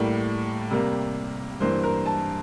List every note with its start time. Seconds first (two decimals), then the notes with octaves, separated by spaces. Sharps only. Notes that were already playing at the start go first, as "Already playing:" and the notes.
Already playing: A2 G3 A#3
0.71 C3 G3 A#3
1.60 G2 E3 A#3 C5
1.83 A#4
2.06 A5